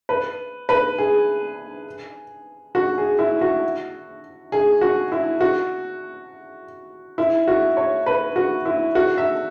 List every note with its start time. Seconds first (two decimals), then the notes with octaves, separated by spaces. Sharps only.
0.09 B4
0.69 B4
0.98 G#4
2.75 F#4
2.98 G#4
3.19 E4
3.41 F#4
4.52 G#4
4.81 F#4
5.12 E4
5.41 F#4
7.18 E4
7.48 F#4
7.77 C#5
8.06 B4
8.36 F#4
8.65 E4
8.95 F#4
9.18 E5